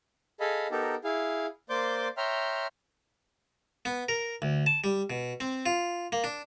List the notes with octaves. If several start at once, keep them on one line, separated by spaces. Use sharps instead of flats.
G#4 A4 D#5 F5 B5
B3 D#4 G4 A4 A#4
E4 G#4 F5
A#3 C5 D5 C6 D6 G6
C#5 E5 G5 A#5 C6 F6
B3
A#4
D2
A5
G3
B2
C4
F4
A#3
D4